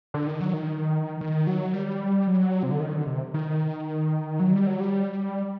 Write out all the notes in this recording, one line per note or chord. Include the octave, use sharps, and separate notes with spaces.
D3
D#3
F#3
D#3
D#3
F#3
G3
F#3
C3
D3
D#3
D3
C3
D#3
F#3
G3
F#3
G3